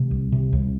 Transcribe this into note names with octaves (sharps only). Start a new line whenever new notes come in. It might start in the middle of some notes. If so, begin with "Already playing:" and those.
Already playing: C3 A3
C2
C3
C2